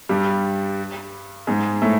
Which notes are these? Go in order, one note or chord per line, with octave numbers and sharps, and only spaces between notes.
G2 G3
G#2 G#3
A2 A3